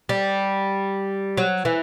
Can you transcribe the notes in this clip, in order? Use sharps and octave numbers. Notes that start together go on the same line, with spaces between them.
G3
F#3
E3